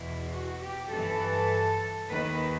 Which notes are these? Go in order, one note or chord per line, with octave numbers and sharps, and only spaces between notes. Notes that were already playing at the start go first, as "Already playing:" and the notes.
Already playing: E2 B2 E4
F#4
G4
G2 E3 A4
D#2 D#3 B4